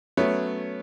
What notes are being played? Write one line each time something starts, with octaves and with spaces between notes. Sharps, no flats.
F#3 A3 B3 C#4